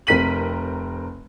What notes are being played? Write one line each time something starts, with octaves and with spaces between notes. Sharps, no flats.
F1 C4 A#4 B6 D#7 F#7